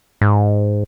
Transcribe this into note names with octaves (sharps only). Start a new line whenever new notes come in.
G#2